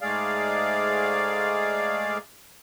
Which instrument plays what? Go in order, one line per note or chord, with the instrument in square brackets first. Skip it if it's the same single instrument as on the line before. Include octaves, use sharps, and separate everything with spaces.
[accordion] G#2 G#3 A3 G#4 D5 F5